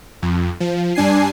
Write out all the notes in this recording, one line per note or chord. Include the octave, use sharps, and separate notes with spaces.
F2
F3
G2 D4 G#5 C7